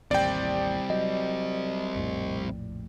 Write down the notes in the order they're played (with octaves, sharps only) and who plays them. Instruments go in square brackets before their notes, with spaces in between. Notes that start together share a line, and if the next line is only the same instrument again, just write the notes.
[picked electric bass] A1 D#2 [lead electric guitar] G3 C4 [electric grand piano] D5 G5
[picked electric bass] F#3 [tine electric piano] D#5
[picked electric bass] A#1 F2 A2